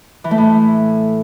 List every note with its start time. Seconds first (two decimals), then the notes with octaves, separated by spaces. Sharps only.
0.24 E3
0.31 A3
0.38 A2